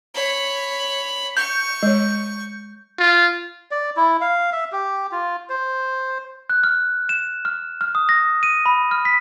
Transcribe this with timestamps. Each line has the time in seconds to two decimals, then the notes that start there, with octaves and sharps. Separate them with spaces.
0.15 C#5 B5
1.37 C#6 G6
1.83 G#3 C#5
2.99 F4
3.71 D5
3.96 E4
4.21 F5
4.52 E5
4.72 G4
5.12 F4
5.49 C5
6.50 F#6
6.63 F6
7.09 E7
7.45 F6
7.81 F6
7.95 D#6
8.09 A#6
8.43 D#7
8.66 B5
8.91 F6
9.05 B6